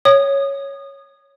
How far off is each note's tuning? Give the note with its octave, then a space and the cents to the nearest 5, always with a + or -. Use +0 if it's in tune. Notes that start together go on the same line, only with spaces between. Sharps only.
C#5 +0 D#6 -25